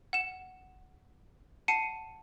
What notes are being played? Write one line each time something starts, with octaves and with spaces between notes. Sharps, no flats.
F#5 E7
F#5 A5 C7 C#7 D#7